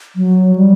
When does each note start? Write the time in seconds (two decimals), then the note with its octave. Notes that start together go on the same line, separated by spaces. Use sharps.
0.16 F#3
0.56 G3